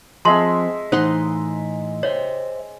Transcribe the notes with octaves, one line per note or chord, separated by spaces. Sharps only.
F3 G#3 C4 E5 A5 C6
A2 E3 D#4 C5 F#5 C6
C5 C#5 E5